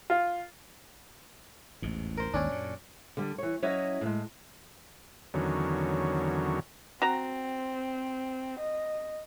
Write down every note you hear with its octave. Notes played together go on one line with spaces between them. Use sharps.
F4
A1 E2 G#2
A#4 C5
G#1 D#2 G#2 C#4 D4
F#2 A#2
D3 G3
E3 C#5
F#3 C#4 E4 C#5 D#5
A2 G#3
E2 D3 D#3 F#3 C#4
C4 F#4 A#5
D#5